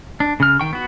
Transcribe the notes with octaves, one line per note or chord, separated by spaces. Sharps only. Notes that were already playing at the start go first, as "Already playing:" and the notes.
D4
C#3 F6
D#3 G5 C#6
B3 F#4